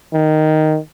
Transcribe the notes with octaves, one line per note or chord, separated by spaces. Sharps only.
D#3